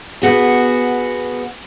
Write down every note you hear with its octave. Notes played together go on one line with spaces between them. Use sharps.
B3 F#4 G#4